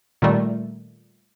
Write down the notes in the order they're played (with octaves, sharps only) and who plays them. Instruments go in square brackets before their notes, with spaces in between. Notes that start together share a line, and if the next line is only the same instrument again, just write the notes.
[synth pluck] A#2 D#3 G3 A3